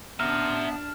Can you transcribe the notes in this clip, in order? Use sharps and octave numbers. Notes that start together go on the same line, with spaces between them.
B3 D4 E5 A5 A#5 F6